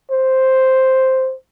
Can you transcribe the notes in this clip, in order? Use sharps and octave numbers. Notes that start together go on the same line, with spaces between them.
C5